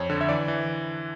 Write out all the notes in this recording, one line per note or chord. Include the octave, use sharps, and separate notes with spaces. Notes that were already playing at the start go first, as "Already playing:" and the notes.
Already playing: F2 C#5
D3
E5
E3 D5
E3